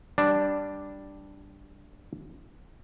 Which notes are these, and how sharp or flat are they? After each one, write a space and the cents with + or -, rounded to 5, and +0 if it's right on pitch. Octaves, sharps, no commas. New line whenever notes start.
G3 +0 D4 +0